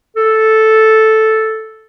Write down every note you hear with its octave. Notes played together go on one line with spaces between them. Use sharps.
A4